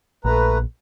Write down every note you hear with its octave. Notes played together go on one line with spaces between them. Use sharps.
A#1 A3 B4 A#5